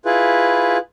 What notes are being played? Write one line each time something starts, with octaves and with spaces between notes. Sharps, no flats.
E4 F4 G#4 B4